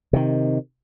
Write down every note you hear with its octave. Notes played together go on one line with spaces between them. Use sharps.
C3 D#3